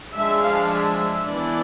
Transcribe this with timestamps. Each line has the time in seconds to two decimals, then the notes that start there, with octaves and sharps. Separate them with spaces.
0.14 F3 G#3 D4 E5
0.42 F5
0.71 E5
1.27 E3 B3 D4 D5